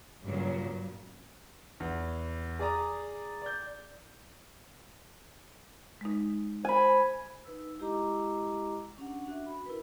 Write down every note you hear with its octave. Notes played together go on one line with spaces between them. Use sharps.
G2 A#2 C#3 F#3
E2
G#4 D5 A#5 D#6
D5 G6
G#3 D#4
C5 G#5 B5
D#4 B4 E6
G#3 E4 G4 D#5 A#5 D6
C#4 D4 F#5
D4 F#4 E5
B5
E4 A#4 B4